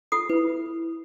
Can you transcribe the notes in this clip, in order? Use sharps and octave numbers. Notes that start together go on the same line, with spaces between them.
F4 A4 D#6 C7
E4 B4